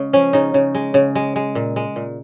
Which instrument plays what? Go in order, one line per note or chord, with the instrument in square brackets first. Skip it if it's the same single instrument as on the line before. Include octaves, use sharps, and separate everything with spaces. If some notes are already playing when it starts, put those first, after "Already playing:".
Already playing: [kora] C#3 G#3
F3 C#4
C#3 D#4
C#3
G#3
C#3
G#3
G#3
A#2
G#3
A#2